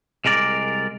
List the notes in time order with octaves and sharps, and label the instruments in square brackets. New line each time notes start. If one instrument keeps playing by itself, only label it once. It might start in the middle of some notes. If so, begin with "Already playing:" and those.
[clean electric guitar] C2 G#3 A#4 D5